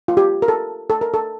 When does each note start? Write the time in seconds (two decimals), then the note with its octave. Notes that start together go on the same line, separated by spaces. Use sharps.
0.08 F4
0.17 G4
0.42 A#4
0.48 A4
0.90 A4
1.01 A#4
1.14 A4